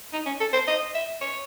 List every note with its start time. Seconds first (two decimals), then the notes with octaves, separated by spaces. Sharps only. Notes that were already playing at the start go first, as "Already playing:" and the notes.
0.13 D#4
0.26 C#4
0.40 A4
0.53 C5
0.67 D#5
0.95 E5
1.21 C#5